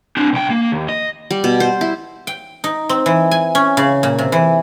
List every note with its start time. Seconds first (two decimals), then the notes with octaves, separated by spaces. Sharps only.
0.17 C4 D4
0.33 B1 G5
0.50 A#3
0.72 D#2
0.89 D#5
1.31 G3
1.44 B2
1.60 C5
1.81 E4
2.27 G5
2.64 D#4
2.89 C4
3.06 E3
3.31 G#5
3.55 C#4
3.77 C#3
4.03 A#2
4.19 C3
4.32 E3